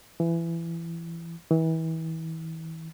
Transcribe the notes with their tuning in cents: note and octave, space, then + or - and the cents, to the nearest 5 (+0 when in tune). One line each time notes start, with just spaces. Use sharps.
E3 +20
E3 -35